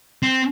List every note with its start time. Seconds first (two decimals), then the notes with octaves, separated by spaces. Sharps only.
0.23 C4